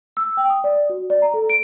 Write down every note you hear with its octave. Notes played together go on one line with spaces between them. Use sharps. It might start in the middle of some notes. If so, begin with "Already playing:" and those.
E6
G5
D#6
D5
F#4
D5
A#5
A4
D7